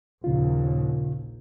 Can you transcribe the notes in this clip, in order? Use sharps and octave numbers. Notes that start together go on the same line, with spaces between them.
A#1 D#2 C#3 F4